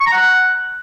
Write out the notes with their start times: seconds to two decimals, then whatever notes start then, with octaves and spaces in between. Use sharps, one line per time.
0.01 C#6
0.07 A#5
0.13 F#5